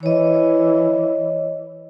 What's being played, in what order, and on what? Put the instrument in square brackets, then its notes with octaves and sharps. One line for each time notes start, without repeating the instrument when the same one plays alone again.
[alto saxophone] E3 [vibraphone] C#5 D#5